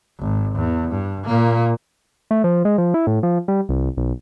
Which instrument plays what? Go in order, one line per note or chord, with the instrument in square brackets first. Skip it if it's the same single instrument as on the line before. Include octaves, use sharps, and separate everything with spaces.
[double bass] G#1
E2
G2
A#2 A#3
[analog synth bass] A3
F3
G#3
F3
E4
A2
F3
G3
C2
B1